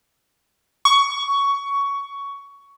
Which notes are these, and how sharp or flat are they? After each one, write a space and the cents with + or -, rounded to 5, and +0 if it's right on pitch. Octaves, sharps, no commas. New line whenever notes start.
C#6 +15